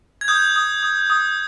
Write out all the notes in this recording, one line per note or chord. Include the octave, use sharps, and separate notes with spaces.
G#6
D#6 G6
D#6
D#6
D#6